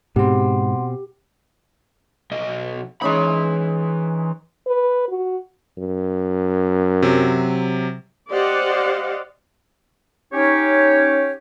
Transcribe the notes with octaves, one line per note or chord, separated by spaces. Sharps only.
G#2 B2 C4 G4 F#5 C6
B1 D#5
E3 G#3 C#4 D#4 B5
B4
F#4
F#2
C3 F#3
G4 C5 D5 D#5 F5 F#5
C#4 D#4 G4 C#5